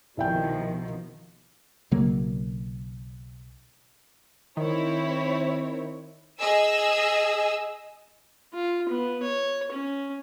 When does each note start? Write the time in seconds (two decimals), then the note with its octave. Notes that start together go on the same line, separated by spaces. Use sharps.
0.17 C2 B2 D#3 F3 E5 G5
1.91 B1 C#3 F#3 A#3
4.57 D#3 C4 E4 C#5
6.39 G#4 D#5 E6
8.54 F4
8.89 B3
9.22 C#5
9.72 C#4